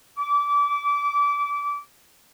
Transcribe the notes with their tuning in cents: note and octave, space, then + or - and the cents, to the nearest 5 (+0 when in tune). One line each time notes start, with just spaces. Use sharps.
D6 -25